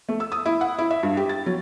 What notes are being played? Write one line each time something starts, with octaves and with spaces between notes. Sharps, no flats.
A3
E6
D#6
E4
F#5
E4
E5
G2
G4
A6
F#3